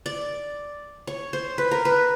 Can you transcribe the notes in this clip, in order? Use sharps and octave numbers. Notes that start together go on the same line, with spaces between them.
D5
C#5
C5
B4
A#4
B4